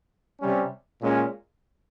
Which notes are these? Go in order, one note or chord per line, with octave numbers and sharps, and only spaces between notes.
C3 G3 C#4
A#2 G#3 C#4